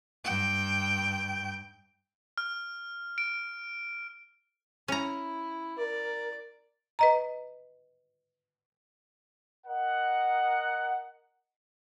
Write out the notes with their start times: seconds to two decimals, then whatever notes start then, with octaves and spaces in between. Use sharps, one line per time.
0.24 G2 G5
2.38 F6
3.18 D7
4.88 C#4 E4 A#5
5.78 A#4 D5
6.99 B4 D#5 A#5
9.66 A#4 D#5 F#5